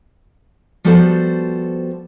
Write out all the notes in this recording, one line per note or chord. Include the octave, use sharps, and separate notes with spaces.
F3 G3 B3 F#4 A4 C5